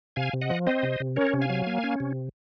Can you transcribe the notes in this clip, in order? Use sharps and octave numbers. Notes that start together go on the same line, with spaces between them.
C3 F5 G#5
C3
D#5 F#5
F3
C4 C5 D#5
C3
C3
C#4 A#4 C#5
C3
F5 G#5
F#3
A#3
C#4
C3